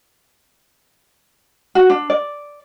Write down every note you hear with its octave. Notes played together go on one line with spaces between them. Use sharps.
F#4
D4
D5